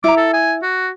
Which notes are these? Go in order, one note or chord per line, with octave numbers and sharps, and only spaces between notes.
E4 A#5 D6
A4
G#5
F#4